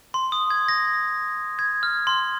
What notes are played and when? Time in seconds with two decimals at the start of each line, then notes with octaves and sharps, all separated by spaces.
0.14 C6
0.32 D#6
0.50 G#6
0.68 A#6
1.59 G#6
1.83 F6
2.07 C6